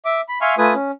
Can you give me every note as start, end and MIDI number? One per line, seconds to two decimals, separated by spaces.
0.05 0.21 76
0.05 0.21 86
0.29 0.39 83
0.41 0.55 76
0.41 0.55 77
0.41 0.55 80
0.41 0.55 84
0.41 0.55 85
0.41 0.55 89
0.58 0.74 57
0.58 0.74 65
0.58 0.74 71
0.58 0.74 80
0.58 0.74 87
0.74 0.91 61